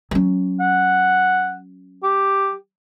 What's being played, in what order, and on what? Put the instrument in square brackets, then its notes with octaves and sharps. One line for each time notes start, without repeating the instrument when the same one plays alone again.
[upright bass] F#3 C#4
[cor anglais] F#5
G4